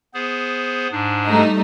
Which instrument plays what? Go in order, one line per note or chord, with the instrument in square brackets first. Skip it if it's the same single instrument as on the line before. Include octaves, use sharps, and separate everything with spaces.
[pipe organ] B3 G#4 C5
G#2 D4
[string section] G3 A3 D#4